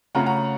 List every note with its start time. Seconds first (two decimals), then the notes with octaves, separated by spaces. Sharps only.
0.15 C#3 A3 C#4 F4 F#5 A#5
0.26 F#5 A#5